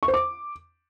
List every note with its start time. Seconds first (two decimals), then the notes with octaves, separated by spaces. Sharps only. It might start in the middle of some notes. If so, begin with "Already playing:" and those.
0.03 C#6
0.08 C5
0.14 D6